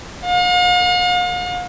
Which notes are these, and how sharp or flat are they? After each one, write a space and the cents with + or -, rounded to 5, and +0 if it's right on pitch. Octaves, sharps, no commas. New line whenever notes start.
F5 +45